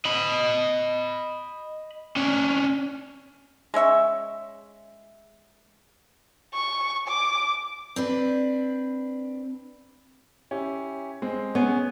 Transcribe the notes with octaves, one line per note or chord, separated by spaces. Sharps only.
D#5 B5
C#4 D4
G#3 C#4 E5 C#6
C#6
D6
C4 D4 B4
C#4 E4 G4
G#3 C4
B3 C#4 G#4